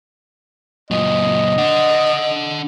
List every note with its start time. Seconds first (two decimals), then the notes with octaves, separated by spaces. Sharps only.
0.91 F#2 A#2 D#5
1.58 D4 F#5